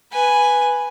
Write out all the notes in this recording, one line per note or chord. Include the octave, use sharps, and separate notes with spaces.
B4 G#5